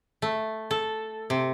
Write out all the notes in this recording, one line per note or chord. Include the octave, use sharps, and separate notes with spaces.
A3
A4
C3